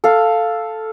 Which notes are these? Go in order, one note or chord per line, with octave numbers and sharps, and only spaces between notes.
A4 F5